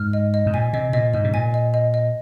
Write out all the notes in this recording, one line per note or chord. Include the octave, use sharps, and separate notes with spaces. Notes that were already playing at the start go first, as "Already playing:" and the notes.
Already playing: G#2 F6
D#5
D#5
G#2
A#2 G#5
C3 D#5
A#2 D#5
G#2 D#5
C3
A#2 G#5
D#5
D#5
D#5